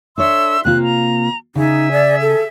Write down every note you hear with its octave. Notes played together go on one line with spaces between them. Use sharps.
D4 A4 C#5 E5 C6 E6
C3 A#3 F4 F#6
A#5
C#3 D#4 G#4 E5
D5
A4